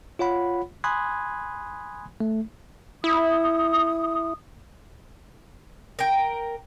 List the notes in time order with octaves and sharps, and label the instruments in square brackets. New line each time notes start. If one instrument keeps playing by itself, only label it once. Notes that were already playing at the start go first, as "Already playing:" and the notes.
[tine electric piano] F4 C#5 F#5 B5
G#5 B5 C6 D#6 F#6 G#6
A3
[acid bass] E4 [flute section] D#6
[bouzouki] A#4 G5